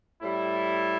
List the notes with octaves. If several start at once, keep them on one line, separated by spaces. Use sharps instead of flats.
A2 G3 E4